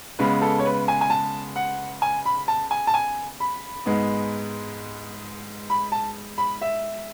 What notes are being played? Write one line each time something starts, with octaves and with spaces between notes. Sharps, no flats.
C#3 G#3 B3 B4
A4
C#5
B4
G#5
G#5
A5
F#5
G#5
B5
A5
G#5
A5
G#5
B5
G#2 G#3 B3
B5
A5
B5
E5